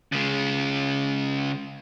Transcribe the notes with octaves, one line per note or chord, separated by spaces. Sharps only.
C#3 G#3